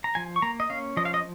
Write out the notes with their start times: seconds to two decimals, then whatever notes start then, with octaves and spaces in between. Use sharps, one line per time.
0.04 A#5
0.15 F3 G#5
0.36 C#6
0.42 A#3 A#5
0.60 D#5
0.70 C#4 F5
0.97 F3 D#5
1.05 F5
1.14 D#5